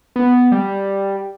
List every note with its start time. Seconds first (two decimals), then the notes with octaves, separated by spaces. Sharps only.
0.16 B3
0.52 G3